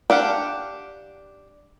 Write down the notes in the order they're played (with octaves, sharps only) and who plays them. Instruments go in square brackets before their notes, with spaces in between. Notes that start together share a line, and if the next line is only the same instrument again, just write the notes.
[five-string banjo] D4 G4 F5 F#5